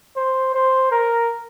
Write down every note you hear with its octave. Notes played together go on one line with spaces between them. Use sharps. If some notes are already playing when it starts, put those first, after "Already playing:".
C5
C5
A#4